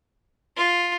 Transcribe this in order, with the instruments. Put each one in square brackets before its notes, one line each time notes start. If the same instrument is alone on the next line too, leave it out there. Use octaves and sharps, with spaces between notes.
[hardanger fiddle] F4